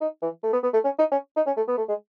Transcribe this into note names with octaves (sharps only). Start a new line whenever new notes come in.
D#4
E3
A3
B3
B3
A3
C#4
D#4
C#4
D#4
C#4
A3
B3
A3
G#3